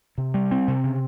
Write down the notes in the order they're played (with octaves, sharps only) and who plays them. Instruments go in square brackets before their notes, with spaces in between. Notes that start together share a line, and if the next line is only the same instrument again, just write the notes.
[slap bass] C3
G3
C4
C3
C#3